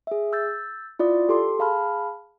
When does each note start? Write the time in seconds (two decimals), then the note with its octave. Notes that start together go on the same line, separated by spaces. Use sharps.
0.07 G#4 E5
0.33 E6 G6 A6
0.99 E4 F4 D5 D#6
1.29 G4 A4 C6 D6
1.59 G#4 F5 A5 B5 F6